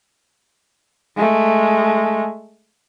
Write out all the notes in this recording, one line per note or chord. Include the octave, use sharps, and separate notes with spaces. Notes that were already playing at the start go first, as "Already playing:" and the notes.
G#3 A3